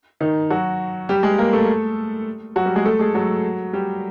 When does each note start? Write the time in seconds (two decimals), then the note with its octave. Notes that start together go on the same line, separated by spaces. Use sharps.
0.20 D#3 D#4
0.50 F#3 F#4
1.09 G3 G4
1.23 G#3 G#4
1.38 A#3 A#4
1.53 A3 A4
2.56 F#3 F#4
2.66 G3 G4
2.75 G#3 G#4
2.85 A3 A4
2.99 G#3 G#4
3.14 F#3 F#4
3.73 G3 G4